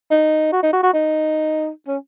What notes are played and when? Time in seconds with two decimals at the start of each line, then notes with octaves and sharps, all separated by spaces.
0.11 D#4
0.53 F#4
0.63 D#4
0.73 F#4
0.83 F#4
0.94 D#4
1.88 C#4